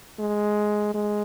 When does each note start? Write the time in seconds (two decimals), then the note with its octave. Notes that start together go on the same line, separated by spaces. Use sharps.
0.19 G#3
0.94 G#3